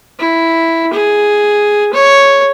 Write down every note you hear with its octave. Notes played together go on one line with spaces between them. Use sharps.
E4
G#4
C#5